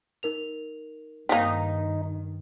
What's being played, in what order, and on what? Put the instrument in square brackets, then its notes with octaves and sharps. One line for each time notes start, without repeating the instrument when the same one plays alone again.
[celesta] D#4 A#4 F7
[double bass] G2 D#3 [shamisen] A#3 C4 [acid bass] D#4 [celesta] B6